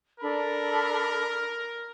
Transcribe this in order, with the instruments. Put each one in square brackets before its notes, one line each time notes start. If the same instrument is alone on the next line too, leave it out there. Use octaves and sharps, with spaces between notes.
[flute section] D4 A4 B5 [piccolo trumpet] A#4